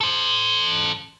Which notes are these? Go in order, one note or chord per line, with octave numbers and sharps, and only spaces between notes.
A4 C5